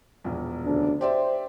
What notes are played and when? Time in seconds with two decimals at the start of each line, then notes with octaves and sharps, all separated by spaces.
0.24 E1 A#1
0.64 D2 C#3 D4
1.01 G4 C5 D5 E5